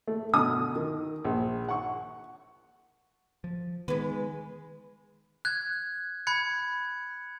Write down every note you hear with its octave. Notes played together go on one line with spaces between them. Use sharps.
A3
B2 D3 D#6
D#3
A#1
F#5 C#6
F3
D#3 G#3 B3 B4
F#6 G#6
B5 F#6 G#6 C#7